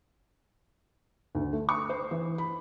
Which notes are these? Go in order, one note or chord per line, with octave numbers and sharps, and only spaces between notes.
D2
A3
C#6
C5
E3
B5